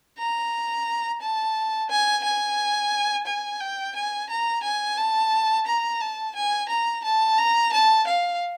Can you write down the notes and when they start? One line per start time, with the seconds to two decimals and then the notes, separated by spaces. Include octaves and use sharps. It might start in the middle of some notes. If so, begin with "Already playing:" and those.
0.18 A#5
1.22 A5
1.90 G#5
2.24 G#5
3.27 G#5
3.61 G5
3.96 G#5
4.30 A#5
4.63 G#5
4.97 A5
5.67 A#5
6.00 A5
6.35 G#5
6.69 A#5
7.04 A5
7.38 A#5
7.72 A5
8.07 F5